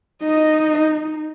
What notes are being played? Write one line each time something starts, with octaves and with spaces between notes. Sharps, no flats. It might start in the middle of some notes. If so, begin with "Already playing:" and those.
D#4 D#5